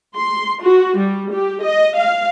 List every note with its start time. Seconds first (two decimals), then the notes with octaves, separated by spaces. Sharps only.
0.17 C6
0.63 F#4
0.99 G3
1.33 G4
1.63 D#5
1.97 F5